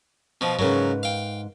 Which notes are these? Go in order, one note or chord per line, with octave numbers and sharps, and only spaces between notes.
B2 F3
G#2 C#3 F#3 A#4 B4
F5 G5